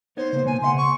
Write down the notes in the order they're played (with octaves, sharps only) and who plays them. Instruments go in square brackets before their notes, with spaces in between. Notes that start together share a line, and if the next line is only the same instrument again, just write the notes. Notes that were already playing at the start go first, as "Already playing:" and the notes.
[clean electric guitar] B3 D#4 C#5 [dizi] C5
[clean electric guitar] C#3 A#3 B3
[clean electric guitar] B2 A#3 B3 [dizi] G#5
[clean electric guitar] C#3 E5 F#5 [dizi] C6
[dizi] C#6